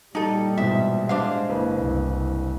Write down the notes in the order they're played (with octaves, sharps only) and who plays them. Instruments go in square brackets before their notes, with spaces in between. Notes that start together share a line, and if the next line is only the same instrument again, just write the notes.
[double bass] A#2 G3 [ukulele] D#4 A4
[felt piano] G#2 B2 E3 [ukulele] E5
[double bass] G#3 [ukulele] D4 C5 F5
[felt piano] F#1 B4
[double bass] C2